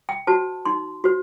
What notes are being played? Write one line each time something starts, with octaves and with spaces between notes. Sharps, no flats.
G5
F#4 C5 A5
D#4 C6
F#4 C5